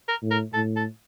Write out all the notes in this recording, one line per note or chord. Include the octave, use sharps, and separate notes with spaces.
A#4
A2
A#4
A2 A4
A4